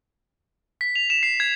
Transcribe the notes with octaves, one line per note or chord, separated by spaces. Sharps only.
B6
F7
E7
C7
G#6